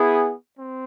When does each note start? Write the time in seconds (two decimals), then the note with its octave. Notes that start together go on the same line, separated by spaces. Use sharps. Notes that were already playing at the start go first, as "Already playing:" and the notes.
Already playing: B3 E4 G#4
0.56 C4